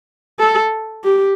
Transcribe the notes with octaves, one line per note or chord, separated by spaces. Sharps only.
A4
G4